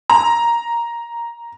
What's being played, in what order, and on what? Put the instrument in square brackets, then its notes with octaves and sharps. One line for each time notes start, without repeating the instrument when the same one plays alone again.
[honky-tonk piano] A#5